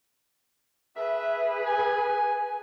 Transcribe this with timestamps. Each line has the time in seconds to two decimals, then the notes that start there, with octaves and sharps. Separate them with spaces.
0.96 G#4 B4 E5
1.66 G#5